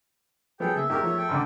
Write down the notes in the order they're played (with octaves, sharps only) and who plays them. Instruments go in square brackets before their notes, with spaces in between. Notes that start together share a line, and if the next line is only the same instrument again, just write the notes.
[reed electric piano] F3 F#3 [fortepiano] B3 [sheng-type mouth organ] G#4 A4 [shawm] G5
[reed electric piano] C#3 A#3 [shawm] E5
[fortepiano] E2 A3 A#3 [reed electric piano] D#4 [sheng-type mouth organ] G4 A#4
[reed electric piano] F3 [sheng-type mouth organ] C#5
[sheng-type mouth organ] A4 G5
[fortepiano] A1 D3 [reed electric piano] C6 D6